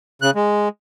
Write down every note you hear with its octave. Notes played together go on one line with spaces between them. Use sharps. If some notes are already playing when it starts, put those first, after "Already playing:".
C#3 F#6
G#3